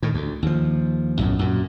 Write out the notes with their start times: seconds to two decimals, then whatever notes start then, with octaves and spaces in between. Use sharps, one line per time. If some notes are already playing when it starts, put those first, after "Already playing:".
0.02 A2 D#3
0.14 D2
0.42 D#2 F3
1.19 B1 F#2 A2
1.39 F#2 A#2